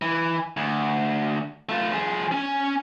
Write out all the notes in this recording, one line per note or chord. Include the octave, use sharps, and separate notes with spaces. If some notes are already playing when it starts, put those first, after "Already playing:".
E3
D2
A3 F4
F3 G#4
C#4 G#5